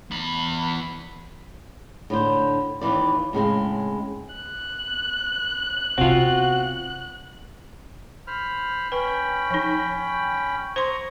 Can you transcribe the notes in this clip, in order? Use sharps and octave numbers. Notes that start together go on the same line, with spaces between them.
E2 B5
A2 D3 C5
D#2 D#3 E3 D5
A2 C#3 G#3 C4
F#6
C3 B3 C4 F4 F#4
C5 B5 F6
C#4 B4 G5 B5
F3 D#4
C5 A#5 C6 C#6 D#6